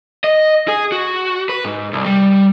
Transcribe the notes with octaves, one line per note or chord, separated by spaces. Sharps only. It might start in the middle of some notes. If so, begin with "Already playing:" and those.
D#5
G#4
F#4
B4
G#2
C2
G3